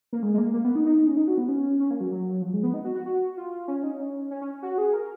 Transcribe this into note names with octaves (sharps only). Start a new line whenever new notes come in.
A#3
G#3
G#3
A#3
A#3
B3
D#4
D#4
C#4
D#4
F#4
B3
C#4
C#4
A#3
F#3
F#3
F3
G#3
B3
D#4
F#4
F#4
F#4
F4
C#4
D#4
C#4
C#4
C#4
F#4
G#4
A#4